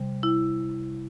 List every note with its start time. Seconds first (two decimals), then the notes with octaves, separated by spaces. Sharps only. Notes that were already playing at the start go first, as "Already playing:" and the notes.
Already playing: C3 G3
0.23 E4